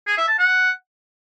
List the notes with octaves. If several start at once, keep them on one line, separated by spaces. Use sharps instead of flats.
G#4
E5
A5
F#5